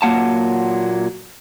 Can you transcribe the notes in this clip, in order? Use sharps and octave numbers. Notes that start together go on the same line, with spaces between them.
A#2 F#3 A#3 F#5 A5